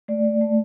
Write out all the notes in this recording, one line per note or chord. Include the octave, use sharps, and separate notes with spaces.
A3 D5
A3
A3